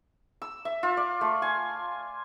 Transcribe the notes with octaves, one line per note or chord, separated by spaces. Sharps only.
E6
E5
F4
D5
A3
G#5